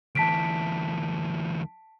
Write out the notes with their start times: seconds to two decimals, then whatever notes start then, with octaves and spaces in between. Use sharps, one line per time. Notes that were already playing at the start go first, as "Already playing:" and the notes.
0.15 D2 E3 A5 B6 D7